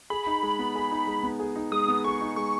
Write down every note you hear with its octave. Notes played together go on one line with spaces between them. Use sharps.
G#4 B5
D#4
G#3
B3
G#4
D#4
G#3
B3
G#4
D#4
G#3 D#6
B3
G#4 C#6
D#4
G#3 C#6